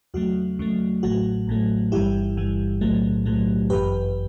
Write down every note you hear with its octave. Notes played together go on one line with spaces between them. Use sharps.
E2 C#3 F#3 A3 F#4
E2 C#3 F#3 A3
A1 A2 F#3 A3 F#4
A1 A2 F#3 A3
G1 G2 E3 G3 E4 G4
G1 G2 E3 G3
B1 A2 F#3 A3
B1 A2 F#3 A3
G1 F#2 E3 G4 B4